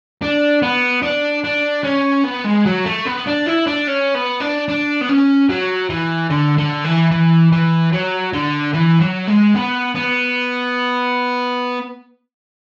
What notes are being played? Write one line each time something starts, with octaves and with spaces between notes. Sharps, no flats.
D4
B3
D4
D4
C#4
B3
G#3
F#3
A3
B3
D4
E4
D4
C#4
B3
D4
D4
B3
C#4
F#3
E3
D3
D3
E3
E3
E3
F#3
D3
E3
F#3
G#3
B3
B3